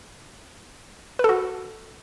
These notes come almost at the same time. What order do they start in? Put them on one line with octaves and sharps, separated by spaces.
B4 A4 F#4